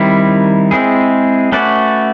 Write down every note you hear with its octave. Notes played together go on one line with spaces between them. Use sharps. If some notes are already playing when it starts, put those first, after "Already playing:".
Already playing: D#3 G3 C4 E4
G#3 C4 E4 G#4
A3 C#4 F#4 B4 D5